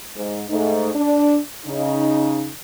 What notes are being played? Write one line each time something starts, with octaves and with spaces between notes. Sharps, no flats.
G#2
G#2 A3 D#4
D4
C#3 D#4